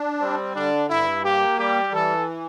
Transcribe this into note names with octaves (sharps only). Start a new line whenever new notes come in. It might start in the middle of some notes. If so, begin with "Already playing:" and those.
Already playing: D4
G3 C4
D3 D4
G2 E4
A#3 G4
G3 G4
E3 A4